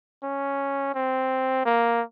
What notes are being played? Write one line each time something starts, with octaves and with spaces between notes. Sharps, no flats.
C#4
C4
A#3